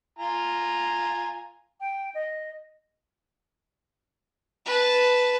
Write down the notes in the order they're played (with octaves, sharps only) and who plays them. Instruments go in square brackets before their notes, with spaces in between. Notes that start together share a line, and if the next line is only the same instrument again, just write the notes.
[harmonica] F4 G#5 A#5
[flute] G5
D#5
[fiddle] B4 A5